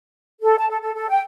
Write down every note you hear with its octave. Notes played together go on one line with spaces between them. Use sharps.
A4
A5
A4
A4
A4
G5